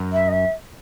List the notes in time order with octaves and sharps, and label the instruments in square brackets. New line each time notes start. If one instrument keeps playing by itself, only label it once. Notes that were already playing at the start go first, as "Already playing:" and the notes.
Already playing: [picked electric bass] F#2
[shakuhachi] E5
D#5
E5